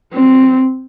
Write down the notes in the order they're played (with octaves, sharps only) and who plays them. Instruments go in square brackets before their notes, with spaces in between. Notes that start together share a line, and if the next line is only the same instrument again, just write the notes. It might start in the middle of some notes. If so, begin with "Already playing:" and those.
[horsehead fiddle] C4